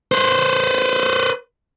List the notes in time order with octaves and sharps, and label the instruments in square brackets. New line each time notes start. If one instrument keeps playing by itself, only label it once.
[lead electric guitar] B4 C5